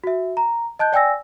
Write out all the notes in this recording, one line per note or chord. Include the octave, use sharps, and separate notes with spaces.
F#4 E5
A#5
D#5 A5 F#6 G6
D5 G5 G#5 E6 A#6